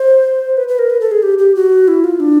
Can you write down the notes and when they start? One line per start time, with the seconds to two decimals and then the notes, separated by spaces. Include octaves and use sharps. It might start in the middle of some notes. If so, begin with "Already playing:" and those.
Already playing: C5
0.57 B4
0.68 B4
0.79 A#4
0.90 B4
1.00 A4
1.11 G#4
1.23 G4
1.38 G4
1.55 F#4
1.88 E4
2.04 F4
2.20 D4